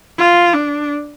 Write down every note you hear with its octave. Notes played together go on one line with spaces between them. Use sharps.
F4
D4